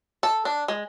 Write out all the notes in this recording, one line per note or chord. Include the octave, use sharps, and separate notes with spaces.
A4
D4
G#3